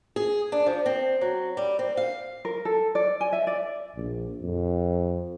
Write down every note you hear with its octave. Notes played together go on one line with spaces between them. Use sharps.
G#4
D4
F3
C4
F#3
G3
C4
F5
A#4
A4
D5
G#5
E5
D5
A#1
F2